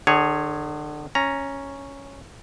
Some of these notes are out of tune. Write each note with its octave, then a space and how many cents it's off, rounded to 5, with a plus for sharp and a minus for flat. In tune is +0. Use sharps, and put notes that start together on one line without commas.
D3 +35 G#4 +0 C#5 +0
C#4 +0 A#5 +0